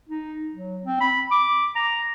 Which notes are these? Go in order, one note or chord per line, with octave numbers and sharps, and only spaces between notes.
D#4
F#3
C4
B5
D6
A#5